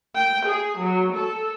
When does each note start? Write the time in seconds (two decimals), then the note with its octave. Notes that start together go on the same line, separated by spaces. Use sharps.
0.14 G5
0.48 G#4
0.80 F#3
1.14 A4